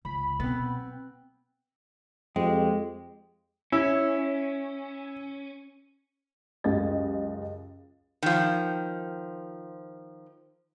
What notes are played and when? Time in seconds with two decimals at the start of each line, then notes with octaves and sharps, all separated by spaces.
0.05 C#2 B5
0.40 B2 B3 C4
2.36 F2 G#3 G4
3.72 C#4 E4
6.64 C#2 F#2 G#3 G4 D#5 A6
8.23 D#3 F3